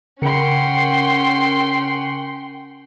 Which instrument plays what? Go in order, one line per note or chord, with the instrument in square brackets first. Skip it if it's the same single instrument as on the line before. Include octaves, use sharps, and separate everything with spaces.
[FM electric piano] C#3 A#4 C#7 [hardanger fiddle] C#4 F#5 [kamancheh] G5 C6